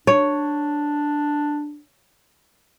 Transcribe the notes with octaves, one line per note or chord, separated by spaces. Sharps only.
D4 C#5